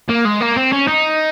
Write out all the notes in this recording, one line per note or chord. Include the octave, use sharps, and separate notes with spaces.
A#3
G#3
A#3
C4
C#4
D#4